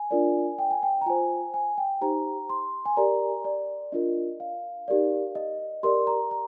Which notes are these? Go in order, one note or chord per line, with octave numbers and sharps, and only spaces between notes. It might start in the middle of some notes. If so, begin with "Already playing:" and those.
Already playing: G#5
D4 F4 A#4 D5
G5
G#5
G5
A#5
F4 C5 G#5
G#5
G5
D#4 G4 C5 A#5
C6
G#5
G4 A#4 D5 A#5
D5
D4 F4 A#4 D#5
F5
D#4 G4 A#4 D5
D#5
G4 A#4 D5 C6
A#5
A#5